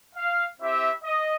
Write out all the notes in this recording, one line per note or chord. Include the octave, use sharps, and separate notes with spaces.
F5
C4 E4 G4 E5
D#5